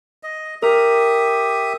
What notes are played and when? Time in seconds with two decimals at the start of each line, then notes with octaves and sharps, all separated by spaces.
0.23 D#5
0.62 G4 A#4 E5 D#6